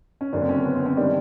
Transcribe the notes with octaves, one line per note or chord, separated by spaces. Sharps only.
C#4
F#1 F#2 D3 D4
C4
C#4
B3
C4
C#4
D#3 G3 D4